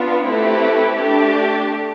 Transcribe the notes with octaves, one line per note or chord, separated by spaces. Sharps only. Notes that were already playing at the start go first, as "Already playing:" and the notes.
Already playing: B3 D4 F4
A3 C4 E4 G4 B4
A3 D4 G4